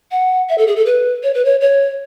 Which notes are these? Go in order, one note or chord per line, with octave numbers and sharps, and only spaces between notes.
F#5
E5
A4
G#4
A4
B4
C#5
B4
C#5
C#5